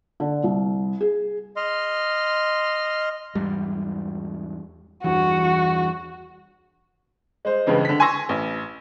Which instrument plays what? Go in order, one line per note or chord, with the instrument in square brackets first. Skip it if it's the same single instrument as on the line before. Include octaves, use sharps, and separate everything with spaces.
[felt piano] D3
C2
G#4
[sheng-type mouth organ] D#5 C6 F6
[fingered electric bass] E2 G#2 G3
[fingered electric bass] E2 G2 E3 [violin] F#4
[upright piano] G#3 C5
C#2 G2 C#3 E3 G#3
D3 B6
G#5 C6 C#6 E6 A#6
A1